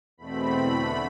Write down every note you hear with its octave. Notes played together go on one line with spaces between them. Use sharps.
E2 B2 A3 C4 B5
E2 D3 A3